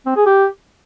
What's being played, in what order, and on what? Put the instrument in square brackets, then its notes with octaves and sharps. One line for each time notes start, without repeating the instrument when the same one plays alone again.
[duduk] C4
G#4
G4